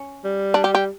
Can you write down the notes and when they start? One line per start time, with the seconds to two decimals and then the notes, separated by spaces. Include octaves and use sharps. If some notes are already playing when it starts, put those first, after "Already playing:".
Already playing: C#4
0.24 G3
0.54 D4
0.64 G4
0.75 G4